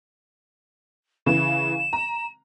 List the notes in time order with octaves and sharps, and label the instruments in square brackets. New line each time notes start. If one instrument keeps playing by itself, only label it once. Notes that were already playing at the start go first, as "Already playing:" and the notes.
[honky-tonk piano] C#3 E3 [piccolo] E7
[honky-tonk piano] A#5